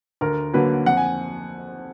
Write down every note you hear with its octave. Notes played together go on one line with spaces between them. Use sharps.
D2 A#4
D3 F#3 A#3 B4
F2 F#5
G#5